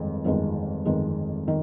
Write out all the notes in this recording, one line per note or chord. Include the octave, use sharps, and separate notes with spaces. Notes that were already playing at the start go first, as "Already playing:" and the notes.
Already playing: G1 F2 D#3 G#3
G1 F2 D#3 G#3
G1 F2 D#3 G#3
D#3